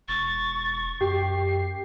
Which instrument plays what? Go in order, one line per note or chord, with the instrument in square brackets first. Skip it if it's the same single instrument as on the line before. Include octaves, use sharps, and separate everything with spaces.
[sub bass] E1 [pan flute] C#6 [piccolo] A6
[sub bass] F#2 [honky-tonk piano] G4 [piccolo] C7